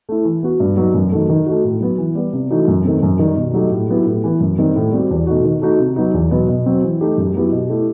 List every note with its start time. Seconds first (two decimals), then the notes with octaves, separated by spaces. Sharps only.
0.09 A3 E4
0.25 E3
0.43 B3 F#4
0.60 G2
0.77 F#3 B3 D#4
0.94 F#2
1.12 D#3 F#3 A3
1.29 D#3
1.46 A3 D#4 F#4
1.64 A2
1.81 F#3 B3
1.98 E3
2.15 G3 B3
2.33 C3
2.50 E3 A3 D#4 F#4
2.68 F#2
2.84 D#3 A3 C4
3.03 F#2
3.19 D#3 G3
3.36 B2
3.54 F#3 A3 D#4 G4
3.71 A2
3.88 F#3 B3 E4 G4
4.06 A2
4.24 E3 B3
4.40 F#2
4.58 D#3 G3 C4
4.76 A2
4.92 G3 C4 F#4
5.10 E2
5.27 B2 A3 D#4 F#4
5.44 D#3
5.61 A3 D#4 F#4
5.79 C3
5.96 F#3 B3 D#4
6.14 E2
6.31 B2 F#3 B3
6.49 B2
6.66 F#3 C4
6.84 E3
7.01 A3 D#4 G4
7.18 F#2
7.34 F#3 B3 E4 G4
7.52 B2
7.69 A3 E4 G4